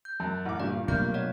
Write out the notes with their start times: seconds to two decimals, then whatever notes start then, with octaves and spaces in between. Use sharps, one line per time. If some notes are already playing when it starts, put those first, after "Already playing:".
0.05 G6
0.20 F#2 A5
0.45 A1 F#5 D6
0.60 G2 A#2 G3 D5
0.88 B2 F#3 A3 A#3 C4 E5 G6
1.14 C#5 D#5 F#5